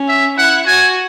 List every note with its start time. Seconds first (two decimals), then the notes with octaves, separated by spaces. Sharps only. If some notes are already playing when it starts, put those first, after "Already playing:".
Already playing: C#4
0.08 E5
0.38 E4 F#5
0.67 F#4 G#5